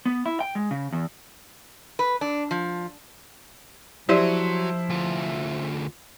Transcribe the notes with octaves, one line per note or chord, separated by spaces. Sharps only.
B3
E4
G5
G#3
C#3
E2
B4
D4
F3
F3 F#3 E4 G4 C5 D5 C6 D#7
D2 F4